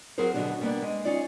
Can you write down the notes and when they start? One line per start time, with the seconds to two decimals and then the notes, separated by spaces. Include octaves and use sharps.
0.18 F#3 C4 G#4 A#4 C5
0.33 B2 D3 F#3 G#3 D4 G4
0.61 G3 A#3 B3 D4
0.82 G#3
1.05 C#4 D#4 F4 D5